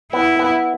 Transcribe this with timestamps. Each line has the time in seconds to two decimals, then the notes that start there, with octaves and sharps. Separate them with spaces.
0.13 B3 E4
0.39 B3